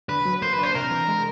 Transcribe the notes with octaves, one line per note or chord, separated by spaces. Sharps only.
D3 B4
F#3
A#3 C5
B4
D4
C5
C3 A#4
E3
G#3